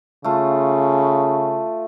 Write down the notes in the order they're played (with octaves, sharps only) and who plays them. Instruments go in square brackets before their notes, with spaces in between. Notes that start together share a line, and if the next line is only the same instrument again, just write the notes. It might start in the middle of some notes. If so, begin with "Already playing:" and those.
[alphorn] C#3 [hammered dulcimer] A3 F4